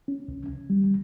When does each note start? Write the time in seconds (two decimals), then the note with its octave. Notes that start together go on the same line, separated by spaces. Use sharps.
0.08 C#4
0.28 C2
0.49 C2
0.70 G3